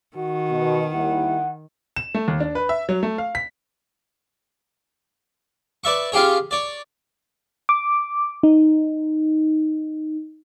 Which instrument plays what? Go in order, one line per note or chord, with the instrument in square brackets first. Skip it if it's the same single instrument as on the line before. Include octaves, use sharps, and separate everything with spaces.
[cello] D#3 [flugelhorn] F#4
[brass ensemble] B2
[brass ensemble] D#2 G3 E4 [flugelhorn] F#5
[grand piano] E7
A3
D#2
D4
B4
E5
F#3
A3
F5
B6
[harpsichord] B4 D5 E5 C#6
C#4 F4 G4 G#4 C#5
C#5 D5
[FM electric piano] D6
D#4